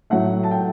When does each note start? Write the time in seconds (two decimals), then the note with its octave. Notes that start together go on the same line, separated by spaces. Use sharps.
0.10 A2 F#3 A3 F#5
0.43 A5
0.51 G5